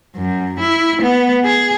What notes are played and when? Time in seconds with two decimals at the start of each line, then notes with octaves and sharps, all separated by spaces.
0.16 F#2
0.59 E4
1.02 B3
1.45 G#4